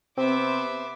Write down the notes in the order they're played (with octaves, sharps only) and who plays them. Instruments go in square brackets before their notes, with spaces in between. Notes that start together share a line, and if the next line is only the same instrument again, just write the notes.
[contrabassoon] C3 [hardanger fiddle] B3 D6 [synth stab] C4 [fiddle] C5 E5